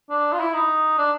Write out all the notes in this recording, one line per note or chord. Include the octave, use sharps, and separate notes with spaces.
D4
F4
E4
D#4
D4